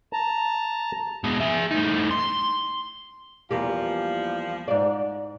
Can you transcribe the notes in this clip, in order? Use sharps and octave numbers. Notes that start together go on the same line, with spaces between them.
A5 A#5
B2 G#3
G#4 E5
A2 D#4
C6
E2 F3 G3 A#3 G4
G#2 D5